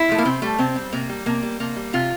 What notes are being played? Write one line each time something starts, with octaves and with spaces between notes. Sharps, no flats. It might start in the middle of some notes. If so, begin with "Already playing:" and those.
Already playing: E4
F3 A3
A#3
C3 C4
G3 A3
C3 C4
G3
C3 A#3
G3
C3 A#3
G3
C3 A#3
G3
C3 F4